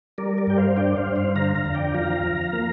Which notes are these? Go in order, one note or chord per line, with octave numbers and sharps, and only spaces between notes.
G3 A#4 D5
A#4 D5
G2 G5
C5 F5
D4 D5 G5
C5 F5
G2
C5 F5
D3 F5 A#5
F5 A#5
F2
D5 G5
F3 F5 A#5
F2
A#3